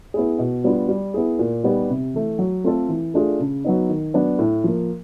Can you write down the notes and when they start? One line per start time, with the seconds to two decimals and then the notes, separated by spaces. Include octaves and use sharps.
0.14 B3 E4 G#4
0.39 B2
0.64 G3 B3 D4 F4
0.89 G3
1.14 B3 E4 G#4
1.39 A#2
1.64 G3 B3 D#4 G4
1.89 C3
2.14 E3 A3
2.39 F#3
2.64 A3 C4 F4 A4
2.89 E3
3.14 A3 D4 F4 G#4
3.39 C#3
3.64 F#3 B3 D#4
3.89 D#3
4.14 F#3 B3 D4
4.39 A2
4.64 F3 A#3